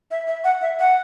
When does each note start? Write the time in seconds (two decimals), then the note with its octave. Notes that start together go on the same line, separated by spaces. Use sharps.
0.11 E5
0.27 E5
0.44 F#5
0.62 E5
0.79 F#5